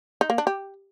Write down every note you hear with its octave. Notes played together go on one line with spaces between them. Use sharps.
D#4
A#3
D4
G4